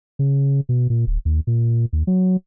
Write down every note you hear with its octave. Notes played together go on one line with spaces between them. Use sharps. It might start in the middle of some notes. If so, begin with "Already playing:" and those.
C#3
B2
A#2
D1
D#2
A#2
D#2
F#3